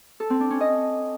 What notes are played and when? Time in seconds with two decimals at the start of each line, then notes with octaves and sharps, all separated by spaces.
0.20 A4
0.30 C4
0.40 D4
0.50 C#4
0.60 D#5